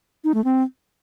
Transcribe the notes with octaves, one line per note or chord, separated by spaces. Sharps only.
D#4
A3
C4